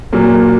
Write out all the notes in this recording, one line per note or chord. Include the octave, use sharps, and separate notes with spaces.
A#2 F#3 A#3